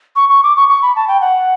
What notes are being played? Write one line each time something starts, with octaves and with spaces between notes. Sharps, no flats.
C#6
C#6
D6
C#6
C#6
B5
A5
G5
F#5